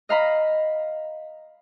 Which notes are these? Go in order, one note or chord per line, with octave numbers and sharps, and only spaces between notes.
D#5 F5 A#5 B5